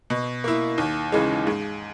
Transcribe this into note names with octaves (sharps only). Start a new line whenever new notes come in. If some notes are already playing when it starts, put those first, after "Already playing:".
B2
A#3 E4
D#2
C#3 E3 G#3
G#2